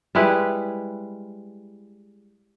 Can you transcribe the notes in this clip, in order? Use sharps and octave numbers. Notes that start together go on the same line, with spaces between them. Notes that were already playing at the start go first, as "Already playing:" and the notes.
G3 G#3 E4 B4